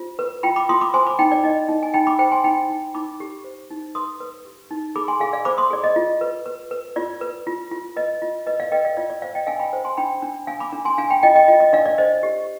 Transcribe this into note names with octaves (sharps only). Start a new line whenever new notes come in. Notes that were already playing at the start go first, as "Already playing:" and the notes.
Already playing: F4 C5
B4
F4 G5 B5
B5 D6
F4 C6 D#6
B5 D6
C5 G#5 C6
B5 D6
D#4 G5 B5
D5
D#4 D#5
D#4
G#5
D#4 G5 B5
B5 D6
C5 G5 B5
G#5 C6
D#4 G5 B5
D#4
D#4 B5 D6
G4
C5
D#4
B4 C6 D#6
B4
G4
D#4
G#4 B5 D6
G#5 C6
G#4 F5 G#5
D5 F5
C5 B5 D6
C6 D#6
G#4 D5
D#5
F4
B4
B4
B4
F4 D5
B4
F4
F4
B4 D#5
F4
B4 D#5
D5 F5
B4 D#5 G5
D5 F5
F4 D5
D5
C5 D5 F5
D#5 G5
D4 F5 G#5
G5 B5
C5
G#5 C6
D4 G5 B5
D4
D4 F5 G#5
B5 D6
D4
G#5 C6
D4 F5 G#5
G5 B5
F4 D#5 G5
D#5 G5
F4 D#5
D#5
D4 D5 F5
D5
C5 D#5
G4